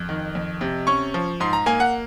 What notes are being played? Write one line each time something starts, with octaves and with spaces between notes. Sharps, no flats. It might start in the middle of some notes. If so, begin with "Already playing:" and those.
Already playing: F2
D#3
F2
C3
C#4 C#6
F3
G#2 C6
A#5
A#3 G#5
F#5